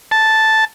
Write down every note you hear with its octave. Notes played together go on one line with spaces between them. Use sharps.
A5